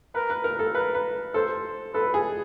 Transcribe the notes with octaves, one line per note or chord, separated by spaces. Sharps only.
A#4 B4
B4
A#4
A4
A#4 B4
B4
A4 C5
A4 B4
G#4